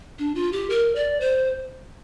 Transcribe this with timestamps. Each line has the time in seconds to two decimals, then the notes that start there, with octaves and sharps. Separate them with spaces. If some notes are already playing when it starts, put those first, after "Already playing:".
0.19 D4
0.35 F4
0.53 G4
0.70 A#4
0.96 D5
1.21 C5